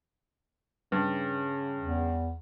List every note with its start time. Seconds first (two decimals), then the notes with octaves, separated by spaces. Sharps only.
0.92 G2 C#3
1.80 E2